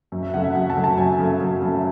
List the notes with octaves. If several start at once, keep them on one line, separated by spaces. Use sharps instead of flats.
F#2
E5
C#3 F#3 A3 F#5
E5
F#2 F#5
A5
C#3 F#3 A3
A5
F#2 G#5
C#3 F#3 A3
F#2
C#3 F#3 A3